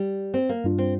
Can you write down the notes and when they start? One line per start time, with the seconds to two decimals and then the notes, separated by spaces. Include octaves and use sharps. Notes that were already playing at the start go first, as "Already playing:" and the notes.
Already playing: G3
0.34 C4
0.49 A#3
0.64 G2 G3 D4 F4
0.78 C4